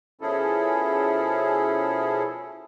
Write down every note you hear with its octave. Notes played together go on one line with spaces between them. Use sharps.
B2 F3 C#4 E4 G#4 A4